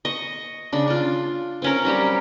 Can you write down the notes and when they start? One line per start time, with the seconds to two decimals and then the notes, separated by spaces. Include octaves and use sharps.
0.05 D#5 C#6
0.73 C#3 D4
0.88 D4 F4
1.62 C4 C#4 A#4
1.85 F#3 G3 G4